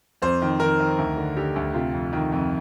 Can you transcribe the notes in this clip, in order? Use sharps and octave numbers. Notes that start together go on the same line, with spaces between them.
F2 C5
D#3
D#3 A#4
D#3
D2
D3
D3 G4
D2
C3 F4
F2
D#3
F2